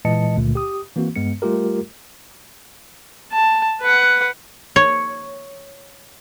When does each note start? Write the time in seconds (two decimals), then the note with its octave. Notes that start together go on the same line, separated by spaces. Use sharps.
0.05 A#2 E3 G#3 D#5 A5 C#7
0.37 C#2 A#2 D3 A3
0.55 G4 D#6
0.96 E3 A#3 C4 F#4
1.16 G2 G#3 B3 C#7
1.42 G3 A3 F4 G4 A#4
3.32 A5
3.81 B4 F#5
4.76 C#5